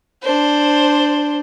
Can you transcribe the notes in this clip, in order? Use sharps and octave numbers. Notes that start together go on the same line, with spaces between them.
D4 C5